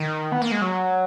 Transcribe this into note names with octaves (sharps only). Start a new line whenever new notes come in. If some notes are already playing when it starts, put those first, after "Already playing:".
Already playing: D#3
B3
A#3
G#3
F#3